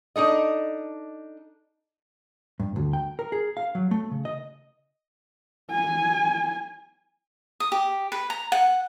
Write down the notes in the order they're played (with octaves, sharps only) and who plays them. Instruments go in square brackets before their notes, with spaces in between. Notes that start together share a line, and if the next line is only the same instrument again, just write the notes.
[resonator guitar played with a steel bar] D4 D#4 A4 D#5
[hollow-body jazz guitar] G2
D2
G5
A#4
G#4
F5
F#3
A3
C#3
D#5
[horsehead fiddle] G#5
[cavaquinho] D#6
G4
B4
A#5
F#5